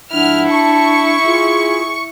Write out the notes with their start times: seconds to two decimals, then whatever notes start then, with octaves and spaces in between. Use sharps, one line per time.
0.13 G#2 F3 D4 E4 F#5 F6
0.50 A5 C#6
1.25 F4 G#4